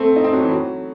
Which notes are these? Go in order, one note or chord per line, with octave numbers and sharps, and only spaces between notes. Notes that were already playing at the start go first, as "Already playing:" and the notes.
Already playing: A3 C4
D#4
C4
F#3
E3
F#3